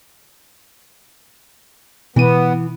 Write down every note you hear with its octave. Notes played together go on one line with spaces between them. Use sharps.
B2 E3 B3 D#7